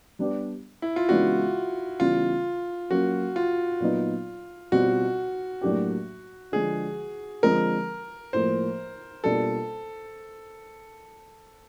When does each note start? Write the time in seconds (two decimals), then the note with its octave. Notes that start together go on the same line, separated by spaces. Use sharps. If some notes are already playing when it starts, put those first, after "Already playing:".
0.19 G3 B3 D4 G4
0.82 E4
0.96 F4
1.09 C#3 E3 G#3 B3 D4 F#4
2.00 C#3 E3 G3 B3 F4
2.90 F#3 A#3 C#4 F#4
3.36 F4
3.80 A#2 F#3 B3 D#4
4.72 B2 G3 C4 F4 F#4
5.61 A2 F#3 A#3 D4 G4
6.52 D3 F3 G#3 G#4
7.42 D3 F3 G#3 C4 A#4
8.33 A2 F3 A#3 C5
9.24 B2 G3 A#3 D4 F4 A4